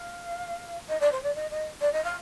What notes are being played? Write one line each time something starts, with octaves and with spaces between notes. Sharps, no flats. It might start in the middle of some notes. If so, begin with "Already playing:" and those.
Already playing: F5
D#5
D5
C5
D5
D#5
D#5
D5
D#5
F5